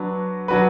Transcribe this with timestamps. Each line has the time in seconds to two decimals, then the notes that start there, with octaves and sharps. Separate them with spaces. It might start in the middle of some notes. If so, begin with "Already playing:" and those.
Already playing: F#3 D4 F#4 B4
0.48 F#3 D4 F#4 B4